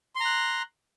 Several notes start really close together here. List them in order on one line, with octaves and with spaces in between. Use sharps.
C6 A#5 F#6